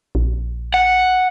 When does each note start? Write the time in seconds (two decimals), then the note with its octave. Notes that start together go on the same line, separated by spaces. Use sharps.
0.15 A#1
0.74 F#5